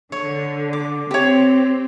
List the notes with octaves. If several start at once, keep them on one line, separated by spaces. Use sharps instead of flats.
D3 C#5
D6
C4 G4 C#5